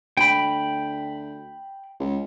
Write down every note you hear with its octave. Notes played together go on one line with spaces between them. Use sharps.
D2 G5 B5
C#2